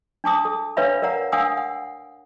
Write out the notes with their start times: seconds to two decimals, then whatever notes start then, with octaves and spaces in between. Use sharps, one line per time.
0.24 D4 A5 D6 D#6
0.45 A4
0.77 D4 B4 C#5 E5 F5 B5
1.02 A#4 D5 F5 F#5 A#5
1.32 D4 F5 F#5 G#5 D#6 E6
1.57 F#5